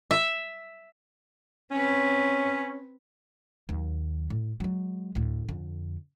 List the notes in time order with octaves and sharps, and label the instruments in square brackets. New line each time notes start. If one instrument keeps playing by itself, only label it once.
[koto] E5
[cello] C4 B4 [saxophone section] C#4
[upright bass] D#2 F#3
A2
F#3 G#3
D2 A2
F2 D3